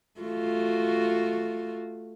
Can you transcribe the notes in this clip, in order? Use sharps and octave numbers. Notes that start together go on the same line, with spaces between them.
A3 F4 F#4